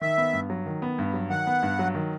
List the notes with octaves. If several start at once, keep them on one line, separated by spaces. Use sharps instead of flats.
D#3 E5
B3
G2
F#3
D#3
B3
G2
F#3
D#3 F#5
B3
G2
F#3
D#3